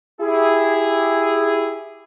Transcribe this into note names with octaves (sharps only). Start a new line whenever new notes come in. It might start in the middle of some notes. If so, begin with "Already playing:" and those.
E4 G4 G#4